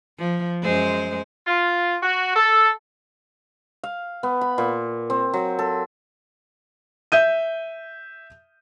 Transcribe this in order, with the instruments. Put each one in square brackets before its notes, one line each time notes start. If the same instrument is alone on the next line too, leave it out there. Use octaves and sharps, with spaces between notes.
[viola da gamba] F3
F#2 G#3 C5
[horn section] F4
F#4
A4
[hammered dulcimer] F5
B3
B5
A#2
C4
F#3
A4
[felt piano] E5 G6 D#7